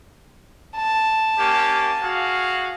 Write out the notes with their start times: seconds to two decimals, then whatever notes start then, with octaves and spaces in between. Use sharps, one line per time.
0.76 A5
1.39 A#3 C#4 G4
2.03 F#4 G#4 F5